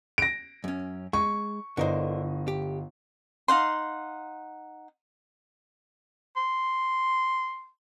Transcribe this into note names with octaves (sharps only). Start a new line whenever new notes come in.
A#6 D7
F#2 C#4
G#3 C#6
G1 D3 E4 A#4 C5 D#5
G4
D#4 F5 F#5 C6
C6